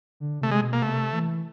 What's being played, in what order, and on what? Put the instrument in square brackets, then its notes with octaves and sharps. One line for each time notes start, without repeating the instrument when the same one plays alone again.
[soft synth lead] D3
[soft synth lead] C3 [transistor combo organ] A3
[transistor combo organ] G#3
[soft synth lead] B2
[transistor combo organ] A#3
[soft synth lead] C3 [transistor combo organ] A3
[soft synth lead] E3